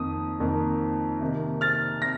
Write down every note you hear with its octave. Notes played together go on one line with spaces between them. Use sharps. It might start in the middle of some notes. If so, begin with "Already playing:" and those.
Already playing: F2 D#3 A#3 D#6
F2 D#3 A#3
C3 D#3 A#3
F6 A6
C3 A#6